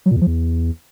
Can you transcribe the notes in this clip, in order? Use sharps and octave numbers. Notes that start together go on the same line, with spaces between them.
F#3
A#2
E2
F3
E2